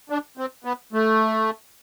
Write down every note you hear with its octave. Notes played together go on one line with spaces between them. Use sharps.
D4
C4
B3
A3